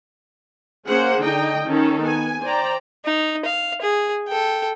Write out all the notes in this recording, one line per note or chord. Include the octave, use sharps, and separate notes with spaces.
A#3 C#4 G#4 C5 F#5
D3 D#4 D#5 G5
D#3 C#4 D#4 A4
B3 G#5
C5 D5 G5 A#5
D#4
F5
G#4
A4 G5